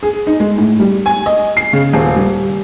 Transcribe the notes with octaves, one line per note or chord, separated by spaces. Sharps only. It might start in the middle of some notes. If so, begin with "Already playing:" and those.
G#4
D#4
G#3
A2
G3
G#5
D#5
C7
C#3
D#1
G3